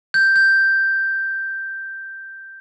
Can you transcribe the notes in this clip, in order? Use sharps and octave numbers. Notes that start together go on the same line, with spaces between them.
G6
G6